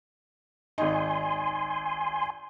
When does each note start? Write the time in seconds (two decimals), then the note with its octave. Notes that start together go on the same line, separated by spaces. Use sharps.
0.78 G#1 D#4 G#5 C6